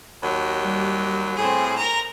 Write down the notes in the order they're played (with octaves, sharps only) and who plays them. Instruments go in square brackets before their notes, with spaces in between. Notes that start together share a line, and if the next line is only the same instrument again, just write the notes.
[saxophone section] D#2 F#3
[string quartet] G3
[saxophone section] A2 [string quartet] C4 G#4
[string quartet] A#4 A#5